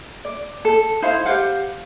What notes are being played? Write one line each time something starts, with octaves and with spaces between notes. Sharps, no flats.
D5
A4
D#4 E4 C5 F5
G4 C5 F5 F#5